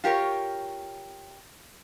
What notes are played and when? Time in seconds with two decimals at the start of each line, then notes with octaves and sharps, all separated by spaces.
0.04 F4 G4 A#4 C#5